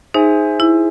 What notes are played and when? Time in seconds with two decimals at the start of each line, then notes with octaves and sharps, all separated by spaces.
0.14 D#4 G#4 C5 E5 G#5
0.60 E4